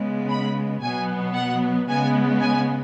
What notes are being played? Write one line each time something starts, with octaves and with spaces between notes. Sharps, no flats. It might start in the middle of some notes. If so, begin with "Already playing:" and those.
Already playing: C#3 G#3 B3
B5
B2 F#3 B3 G#5
F#5
C#3 G#3 B3 G#5
G#5